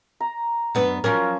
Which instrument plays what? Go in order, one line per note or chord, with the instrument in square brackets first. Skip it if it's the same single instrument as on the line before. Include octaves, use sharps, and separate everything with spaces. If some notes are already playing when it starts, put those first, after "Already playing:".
[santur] A#5
[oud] F#2 B3 D4
[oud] F3 F#3 A#4 [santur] C#4